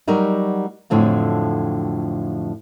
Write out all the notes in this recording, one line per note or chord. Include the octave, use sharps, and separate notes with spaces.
F#3 G3 D#4 F#4 A#4
F2 A2 D3 F3 F#3